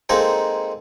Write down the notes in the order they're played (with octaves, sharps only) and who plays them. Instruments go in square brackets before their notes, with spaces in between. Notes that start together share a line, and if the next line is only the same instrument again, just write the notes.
[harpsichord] G#3 A#3 C4 D#4 A4